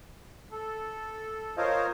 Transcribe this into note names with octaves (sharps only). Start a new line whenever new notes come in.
A4
F4 A#4 C5 C#5 D#5 F5